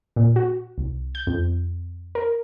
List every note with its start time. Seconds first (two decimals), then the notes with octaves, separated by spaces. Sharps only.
0.16 A#2
0.36 F#4
0.78 C2
1.15 G6
1.27 F2
2.15 A#4